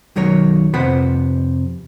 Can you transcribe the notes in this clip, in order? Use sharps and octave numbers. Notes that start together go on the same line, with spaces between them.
B1 D#3 F#3 A#4 C#5
F2 C3 B4 C5 F#5 B5